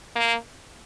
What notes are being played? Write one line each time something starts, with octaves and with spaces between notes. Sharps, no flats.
A#3